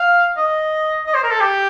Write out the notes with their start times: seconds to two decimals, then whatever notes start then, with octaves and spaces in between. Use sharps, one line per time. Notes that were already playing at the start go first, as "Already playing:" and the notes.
Already playing: F5
0.38 D#5
1.07 D#5
1.15 C5
1.23 A#4
1.31 A4
1.40 G4